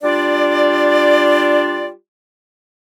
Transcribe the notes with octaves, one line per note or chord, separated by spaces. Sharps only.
G3 D4 F4 D5